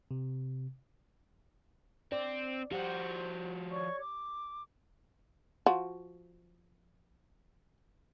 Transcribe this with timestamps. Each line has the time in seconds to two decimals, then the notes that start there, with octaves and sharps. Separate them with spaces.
0.11 C3
2.12 C4 D5
2.72 F3 F#4 G4 C5
3.71 C#5 D5 C#6
4.01 D6
5.66 F3 F#4